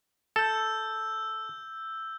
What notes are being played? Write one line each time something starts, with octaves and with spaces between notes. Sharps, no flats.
A4 E6 G6